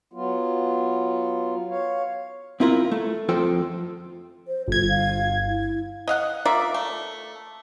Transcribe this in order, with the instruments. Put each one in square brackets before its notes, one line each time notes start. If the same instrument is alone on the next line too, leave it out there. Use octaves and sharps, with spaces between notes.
[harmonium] F#3 B3 F4
C#5 F5
[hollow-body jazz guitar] C4 E4 F4 A#4
A3
F2 F4 A4 C5 G5
[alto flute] C5
[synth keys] G1 G#6 [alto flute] F4
[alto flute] F5
E4
[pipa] D#5 F5 F#5
F4 A#4 D5 E5
A3